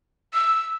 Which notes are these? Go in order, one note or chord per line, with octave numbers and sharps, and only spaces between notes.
E6